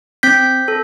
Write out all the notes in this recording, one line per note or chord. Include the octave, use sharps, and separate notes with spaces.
C4 G6 B6
A4